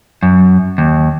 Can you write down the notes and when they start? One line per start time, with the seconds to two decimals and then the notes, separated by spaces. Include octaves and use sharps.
0.23 F#2
0.78 D#2